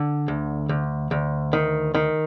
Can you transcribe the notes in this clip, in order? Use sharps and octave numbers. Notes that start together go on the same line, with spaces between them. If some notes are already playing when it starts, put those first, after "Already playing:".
Already playing: D3
D2
D2
D2
D#3
D#3